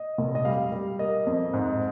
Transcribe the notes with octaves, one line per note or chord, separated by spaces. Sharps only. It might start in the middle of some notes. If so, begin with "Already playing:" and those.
Already playing: D#5
F1
D#5
G3 F5
G3
A#3 D#5
F2
G#2